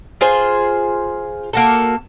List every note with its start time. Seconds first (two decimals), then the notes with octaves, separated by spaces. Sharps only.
0.21 F4 G#4 C5
1.53 A#3 F#4 A4